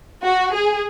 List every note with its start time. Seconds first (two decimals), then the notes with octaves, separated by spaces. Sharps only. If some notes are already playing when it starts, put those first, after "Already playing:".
0.23 F#4
0.53 G#4